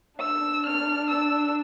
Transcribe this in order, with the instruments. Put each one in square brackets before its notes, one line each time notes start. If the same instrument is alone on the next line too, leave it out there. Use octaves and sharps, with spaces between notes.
[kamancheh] D4 [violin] E6
[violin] F6
E6